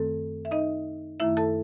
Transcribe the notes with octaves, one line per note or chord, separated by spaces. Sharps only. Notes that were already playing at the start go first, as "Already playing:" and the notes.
Already playing: F#2 D#3 A3 C4 A4
E5
D#4 D#5
F#2 D#3 A3 E4 E5
A4 A5